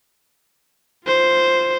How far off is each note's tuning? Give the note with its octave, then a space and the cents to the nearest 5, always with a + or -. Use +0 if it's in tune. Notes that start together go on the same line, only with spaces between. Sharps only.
F4 +0 C5 +0